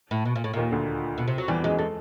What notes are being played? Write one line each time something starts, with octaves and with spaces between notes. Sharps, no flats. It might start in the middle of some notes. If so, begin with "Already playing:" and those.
A2
B2
A#2
A2
D#2 A#2 D#3
D2 D3
B2
C3
F#3
E2 E3 G3
F#2 F#3 G#3
G#3 A3